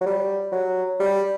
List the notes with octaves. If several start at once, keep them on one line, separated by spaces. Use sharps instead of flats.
F#3
G3
F#3
G3